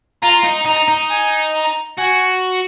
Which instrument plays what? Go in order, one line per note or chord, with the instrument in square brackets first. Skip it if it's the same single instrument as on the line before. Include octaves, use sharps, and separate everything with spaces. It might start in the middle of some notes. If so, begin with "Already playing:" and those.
[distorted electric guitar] F4 [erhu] A#5
[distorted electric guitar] D#4
[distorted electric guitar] D#4 [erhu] A#5
[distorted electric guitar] D#4
[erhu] G#5
A#5
[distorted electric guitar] F#4 [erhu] G#5